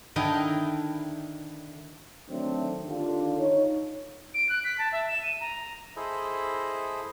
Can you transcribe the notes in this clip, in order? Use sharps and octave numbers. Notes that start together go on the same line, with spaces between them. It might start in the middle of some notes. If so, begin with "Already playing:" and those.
D3 D#3 D#4 E4 D#5 G5
D3 D#3 F#3 A3 C4 D4
D3 D#3 D4 F4 G4 A4
D#4 C#5
D7
F#6
B6
A5
E5
E7
D#7
A#5
E4 G#4 A4 C5 D#5 B5